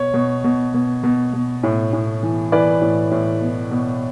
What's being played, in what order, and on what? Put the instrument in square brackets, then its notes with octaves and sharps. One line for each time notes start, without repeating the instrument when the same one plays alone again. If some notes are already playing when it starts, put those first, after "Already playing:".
Already playing: [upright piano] B2 C#5
B2
B2
B2
B2
B2
A2
A2
E3
E3 B4 D5
A2
A2
B2
B2